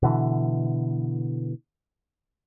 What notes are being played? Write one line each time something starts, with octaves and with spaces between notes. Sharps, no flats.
B2 D3 E3